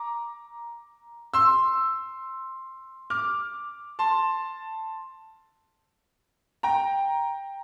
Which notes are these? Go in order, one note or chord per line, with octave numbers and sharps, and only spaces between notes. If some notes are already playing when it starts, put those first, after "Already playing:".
Already playing: A#5 D6
C6 E6
D6 F6
A5 C6
G5 A#5